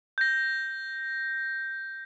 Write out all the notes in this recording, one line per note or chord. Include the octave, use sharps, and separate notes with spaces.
G6 A#6